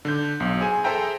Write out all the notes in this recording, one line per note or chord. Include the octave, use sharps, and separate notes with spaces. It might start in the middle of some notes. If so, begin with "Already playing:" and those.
D3 D4 G6
B1
G#4 C5 G#5
G#4 A4 C5 E5 G5 A#5